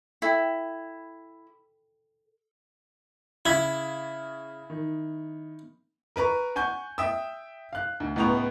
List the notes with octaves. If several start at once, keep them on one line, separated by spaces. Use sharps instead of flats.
E4 A4 G5
C#3 E4 G#6 B6
D#3
A#4 B4 A#5 C#6
F#5 G#5 C#6 G6
E5 G5 D#6 E6
F5 F#6
D2
C#2 A2 B3 A#5 C#6 F7